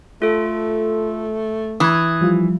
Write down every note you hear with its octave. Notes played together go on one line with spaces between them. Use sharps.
A3 F4 A4
E3 D#6 F#6 G#6
F3 G3 F4